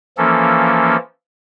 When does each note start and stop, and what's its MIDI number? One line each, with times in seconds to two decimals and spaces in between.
0.18 0.97 52
0.18 0.97 53
0.18 0.97 58
0.18 0.97 61
0.18 0.97 69